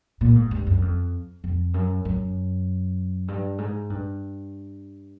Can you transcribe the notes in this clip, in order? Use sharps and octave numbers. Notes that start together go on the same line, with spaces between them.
A#2
G#2
G2
F#2
F2
F2
F#2
F#2
G2
G#2
G2